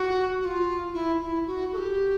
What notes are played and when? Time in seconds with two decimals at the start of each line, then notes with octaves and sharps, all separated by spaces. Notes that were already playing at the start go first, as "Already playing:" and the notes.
Already playing: F#4
0.41 F#4
0.45 F4
0.94 E4
1.21 E4
1.46 F#4
1.73 A4
1.77 G4